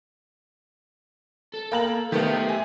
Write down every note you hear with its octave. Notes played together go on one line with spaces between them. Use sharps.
A4
A#3 A#5 F#7
D#3 A3 B3 G4 E5
G#5